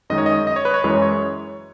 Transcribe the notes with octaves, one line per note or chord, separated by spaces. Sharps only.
F#2 D#3 G#3 D#5
C#5
D#5
D#5
C#5
B4
C#5
F#2 E3 G#3 C#5
C#5